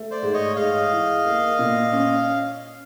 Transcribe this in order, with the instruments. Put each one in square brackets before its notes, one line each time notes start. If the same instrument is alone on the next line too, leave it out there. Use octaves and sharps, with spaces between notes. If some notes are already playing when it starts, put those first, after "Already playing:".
Already playing: [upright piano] A3
[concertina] C5 D5
[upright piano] G#2
[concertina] C#5 D#5
[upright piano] G#2 [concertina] D#5 F5
[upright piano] E3
A#3
A#2
C#4